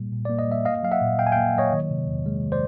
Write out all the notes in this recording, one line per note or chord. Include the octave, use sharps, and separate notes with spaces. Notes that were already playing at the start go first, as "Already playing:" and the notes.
Already playing: A#2 G3 A#3
A#2
A#3 D5
D#5
G3 E5
A#3 D#5 F5
F#3 F5
E5 F#5
A#2
A#2 F5 G5
G#5
F5 G5
A#3
F#3 C#5 D#5
D#3
C3
E2
G#3
D#3
C5 D5